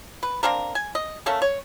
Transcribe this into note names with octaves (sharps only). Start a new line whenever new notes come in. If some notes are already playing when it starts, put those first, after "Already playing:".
B4
A#3 C4 D4 A#4
G#5
D#5
A3 A#3 C#4 A4
C#5